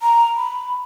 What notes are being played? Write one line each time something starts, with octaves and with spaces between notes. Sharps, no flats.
A#5
B5